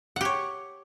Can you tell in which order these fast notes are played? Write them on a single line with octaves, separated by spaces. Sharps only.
F#5 G4 C#5